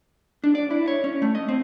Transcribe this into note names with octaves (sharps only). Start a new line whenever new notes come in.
D4
D5
E4
C#5
C#4
A3
D#5
C4